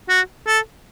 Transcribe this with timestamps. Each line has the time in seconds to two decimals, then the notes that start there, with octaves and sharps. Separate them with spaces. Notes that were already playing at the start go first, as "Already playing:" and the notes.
0.09 F#4
0.47 A4